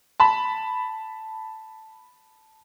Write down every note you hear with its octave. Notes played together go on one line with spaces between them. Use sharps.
A5 B5